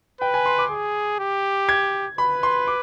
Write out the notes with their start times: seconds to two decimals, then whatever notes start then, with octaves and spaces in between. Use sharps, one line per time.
0.21 B4 G5
0.34 G#5
0.46 C6
0.58 D6
0.70 G#4
1.19 G4
1.69 G#6
2.18 B4 B5
2.43 C6
2.67 D6